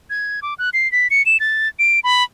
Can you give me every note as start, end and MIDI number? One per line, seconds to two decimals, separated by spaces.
0.10 0.40 92
0.42 0.54 86
0.59 0.70 90
0.73 0.90 96
0.92 1.08 95
1.11 1.25 97
1.26 1.40 100
1.40 1.68 93
1.79 2.00 98
2.04 2.23 83